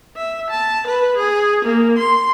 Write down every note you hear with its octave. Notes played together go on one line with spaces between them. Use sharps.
E5
A5
B4
G#4
A#3
C6